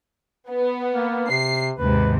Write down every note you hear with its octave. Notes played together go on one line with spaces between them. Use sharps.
B3
A#3
C3 C7
D#2 G#2 C3 B4